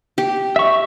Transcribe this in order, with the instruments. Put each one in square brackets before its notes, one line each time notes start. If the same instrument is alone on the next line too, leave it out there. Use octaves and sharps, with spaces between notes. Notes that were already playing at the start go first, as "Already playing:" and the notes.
[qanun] G4
[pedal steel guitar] E5 C#6